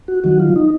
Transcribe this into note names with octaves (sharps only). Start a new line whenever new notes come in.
F#4
D#3 F#3 F#4
F4
D#4